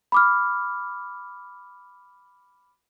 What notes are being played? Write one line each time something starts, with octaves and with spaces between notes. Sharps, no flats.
B5 D6 F6